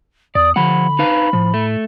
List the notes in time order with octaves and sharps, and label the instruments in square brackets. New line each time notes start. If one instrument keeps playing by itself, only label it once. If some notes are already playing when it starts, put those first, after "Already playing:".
[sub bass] E2 [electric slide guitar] D5 [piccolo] D#6
[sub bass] D3 [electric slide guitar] F3 F#5 [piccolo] B5
[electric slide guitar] D#4 B4 F5
[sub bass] A2 [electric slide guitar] F3
[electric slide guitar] A3